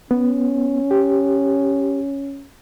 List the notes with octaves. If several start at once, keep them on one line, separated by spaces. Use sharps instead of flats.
B3 C#4
G4